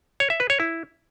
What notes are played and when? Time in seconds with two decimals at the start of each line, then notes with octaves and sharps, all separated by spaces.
0.20 C#5
0.30 E5
0.40 B4
0.50 C#5
0.60 E4